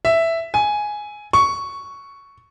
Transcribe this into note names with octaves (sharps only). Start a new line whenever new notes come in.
E5
G#5
C#6